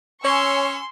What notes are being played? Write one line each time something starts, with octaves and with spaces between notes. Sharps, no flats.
C#4 C#5 G#5 C6 C#6 E6